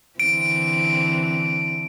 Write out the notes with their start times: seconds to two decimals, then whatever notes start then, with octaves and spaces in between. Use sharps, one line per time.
0.20 D3 E3 C4 D7